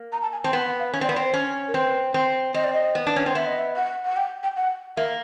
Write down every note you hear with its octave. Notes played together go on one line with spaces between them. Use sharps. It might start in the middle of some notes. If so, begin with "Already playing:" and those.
Already playing: A#3
A#5
A5
G#5
C4 A5
B3 G5
F#5
F5
C#4
C4 D5
B3
D5
C4 C#5
C5
C#4
A#4
C4 B4
C4
C4 D#5
D5
D#5
B3
D4
C#4
C4
B3 E5
D#5
E5
F#5
F#5
G5
G5
F#5
A#3 E5